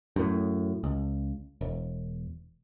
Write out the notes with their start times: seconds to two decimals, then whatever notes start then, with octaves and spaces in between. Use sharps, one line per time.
0.16 F#2 A2
0.84 C#2
1.61 E1